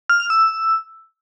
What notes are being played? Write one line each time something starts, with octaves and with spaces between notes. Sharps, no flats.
F6
F6
E6